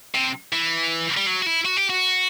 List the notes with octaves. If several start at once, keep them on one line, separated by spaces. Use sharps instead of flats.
C3
E3
G3
F#3
F#4
E4
F#4
G4
F#4